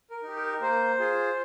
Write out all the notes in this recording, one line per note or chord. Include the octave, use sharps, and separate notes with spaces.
A#4
D#4 G4
A#4
A#3 C5
F4 G#4